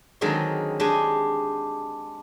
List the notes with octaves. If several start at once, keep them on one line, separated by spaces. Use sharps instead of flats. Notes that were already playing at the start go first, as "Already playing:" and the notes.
D3 D#3 F#3 G#3 C4
G#3 D4 G4 G#5